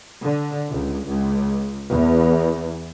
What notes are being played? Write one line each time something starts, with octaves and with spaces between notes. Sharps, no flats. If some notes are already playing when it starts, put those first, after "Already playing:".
D3
C#2
C#2
E2